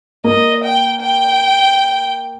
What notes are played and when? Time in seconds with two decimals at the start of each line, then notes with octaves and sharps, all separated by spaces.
0.24 A#3 D#5
0.64 G5
1.01 G5